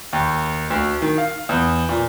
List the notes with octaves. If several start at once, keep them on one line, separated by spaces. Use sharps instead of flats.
D#2
D2
D#3
F5
E2
A#2